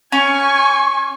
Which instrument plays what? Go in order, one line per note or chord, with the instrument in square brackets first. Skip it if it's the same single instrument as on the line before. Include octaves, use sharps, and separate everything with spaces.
[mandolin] C#4 [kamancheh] G#5 [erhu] C#6